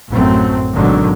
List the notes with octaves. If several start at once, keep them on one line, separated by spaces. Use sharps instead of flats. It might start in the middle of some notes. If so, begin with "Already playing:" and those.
A1 F#2 F#3 A3 C4
G#1 B2 D3 D#3 F#3